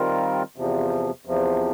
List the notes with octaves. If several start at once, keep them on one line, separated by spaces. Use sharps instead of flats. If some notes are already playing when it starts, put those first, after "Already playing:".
Already playing: D#3 G3 C4 F4 A#4
E2 C3 F3
E2 C3 F3